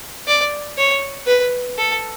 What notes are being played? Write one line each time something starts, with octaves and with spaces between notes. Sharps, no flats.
D5
C#5
B4
A4